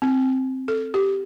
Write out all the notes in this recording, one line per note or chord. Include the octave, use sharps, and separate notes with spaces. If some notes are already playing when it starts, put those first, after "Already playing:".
C4
A4
G4